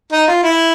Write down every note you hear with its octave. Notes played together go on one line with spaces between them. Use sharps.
D#4
F4
E4